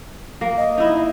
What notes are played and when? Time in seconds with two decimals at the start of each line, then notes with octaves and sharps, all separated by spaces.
0.41 A#3
0.58 D#5
0.78 D#4 E4